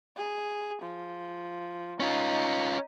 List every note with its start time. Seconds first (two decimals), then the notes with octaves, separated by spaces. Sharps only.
0.17 G#4
0.82 F3
2.00 C#4 D#4 F4